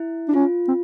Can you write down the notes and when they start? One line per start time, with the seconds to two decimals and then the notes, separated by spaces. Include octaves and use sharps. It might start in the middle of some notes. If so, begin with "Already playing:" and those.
Already playing: E4
0.29 D4
0.34 C#4 F4
0.68 C4